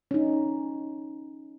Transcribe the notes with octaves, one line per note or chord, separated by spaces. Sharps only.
C#4 D#4